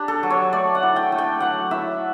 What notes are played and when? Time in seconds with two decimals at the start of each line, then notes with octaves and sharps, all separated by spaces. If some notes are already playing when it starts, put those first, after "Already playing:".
Already playing: D4 G4
0.08 A4
0.23 F#3
0.30 C#5
0.53 A3 D5
0.75 F#5
0.83 E4
0.96 G5
1.12 A3
1.18 G5
1.40 F#3 F#5
1.71 E4 E5